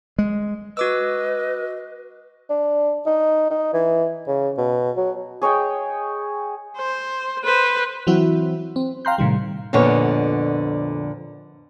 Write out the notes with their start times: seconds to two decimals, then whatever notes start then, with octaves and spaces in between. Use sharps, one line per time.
0.18 G#3
0.77 F#4 B4 D#5 D6 E6
2.50 D4
3.06 D#4
3.50 D#4
3.74 E3
4.27 C#3
4.58 B2
4.97 F#3
5.42 G#4 C#5 D#5 G5
6.78 C5
7.44 B4 C5
8.07 E3 F#3 C4 E4 F#4
8.76 C4
9.05 F5 G5 A#5 C6 F#6 G6
9.18 A2 C3 D#3 G3
9.73 F2 A#2 D3 B3 C#5